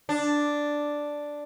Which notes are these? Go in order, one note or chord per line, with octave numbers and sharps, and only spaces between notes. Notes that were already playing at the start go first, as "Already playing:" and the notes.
D4